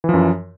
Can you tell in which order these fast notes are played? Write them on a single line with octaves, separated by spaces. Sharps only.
E3 F3 F#2